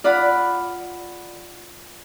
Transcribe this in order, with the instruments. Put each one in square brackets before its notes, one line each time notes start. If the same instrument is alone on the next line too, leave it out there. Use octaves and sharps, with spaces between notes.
[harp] F4 D5 F5 F#5 B5